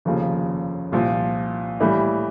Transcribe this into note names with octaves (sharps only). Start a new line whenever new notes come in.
F1 D#2 C#3 F3
C2 A#2 F3
A2 E3 G3